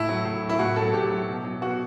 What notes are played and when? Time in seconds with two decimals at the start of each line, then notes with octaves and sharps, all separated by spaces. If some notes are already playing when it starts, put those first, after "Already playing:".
Already playing: A2 E4
0.09 F#3
0.25 A2
0.43 F#3
0.49 E4
0.59 A2 F#4
0.76 F#3 A4
0.93 A2 G4
1.11 F#3
1.28 B2
1.44 F#3
1.61 B2 F#4